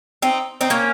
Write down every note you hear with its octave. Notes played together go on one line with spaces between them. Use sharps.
C4 D#4
C4 D#4
A#3 C#4